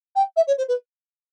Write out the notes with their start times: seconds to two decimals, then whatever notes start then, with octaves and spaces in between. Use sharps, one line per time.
0.15 G5
0.36 E5
0.47 C#5
0.58 C5
0.68 B4